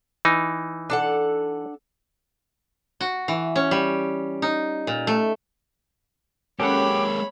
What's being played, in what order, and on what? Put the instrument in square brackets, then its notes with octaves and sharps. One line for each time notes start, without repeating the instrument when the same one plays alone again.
[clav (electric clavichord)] E3 D#4
[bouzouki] D4 A4 F#5
[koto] F#4
E3
C#4
G3
D#4
A#2
A3
[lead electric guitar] G#3 A#3 [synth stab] C#4 A4 F#5 [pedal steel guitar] G4 [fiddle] C#5 B5